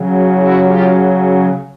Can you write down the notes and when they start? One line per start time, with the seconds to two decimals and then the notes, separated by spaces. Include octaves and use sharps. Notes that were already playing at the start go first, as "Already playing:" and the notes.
Already playing: C#3 F#3
0.35 E4 F#4
0.63 F4 G4